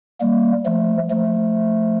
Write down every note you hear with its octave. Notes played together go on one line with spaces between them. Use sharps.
G3 A#3
F3 A3
F3 A3